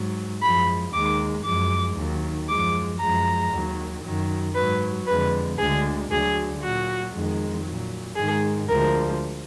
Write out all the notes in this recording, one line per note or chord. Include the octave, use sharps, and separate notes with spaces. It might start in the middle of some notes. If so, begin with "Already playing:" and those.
Already playing: G#2 F#3
F#2 F3 G#3 B5
D#2 D#3 G#3 D6
F#2 F3 G#3 D6
D#2 D#3 F#3
F#2 F3 G#3 D6
F#2 F3 G#3 A#5
D#2 D#3 F#3
F#2 D#3 F#3
G#2 F#3 B4
F2 D3 G#3 B4
D2 D3 G#3 G#4
D2 D3 F#3 G#4
A#2 F#3 F#4
F2 D#3 G#3
A#2 F#3
G#2 D#3 G#3 G#4
D2 D3 F3 G#3 A#4